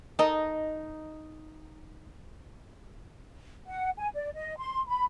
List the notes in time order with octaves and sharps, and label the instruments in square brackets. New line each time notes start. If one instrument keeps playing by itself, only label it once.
[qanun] D#4 [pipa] A4 A#4 D#5
[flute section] F#5
G#5
D5
D#5
C6
B5